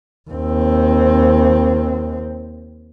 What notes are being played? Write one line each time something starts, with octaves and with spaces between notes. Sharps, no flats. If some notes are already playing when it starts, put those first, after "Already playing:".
D#2 C4